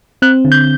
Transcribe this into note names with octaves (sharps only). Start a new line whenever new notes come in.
C4 F#6
D3
G6